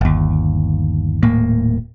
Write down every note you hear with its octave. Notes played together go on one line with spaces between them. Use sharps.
G1 D#2
D#1 A2 A#3